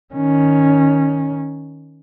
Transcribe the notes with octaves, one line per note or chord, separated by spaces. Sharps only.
D#3 C#4